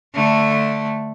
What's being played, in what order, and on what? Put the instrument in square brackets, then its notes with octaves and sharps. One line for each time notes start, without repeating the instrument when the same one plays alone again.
[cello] D3 A3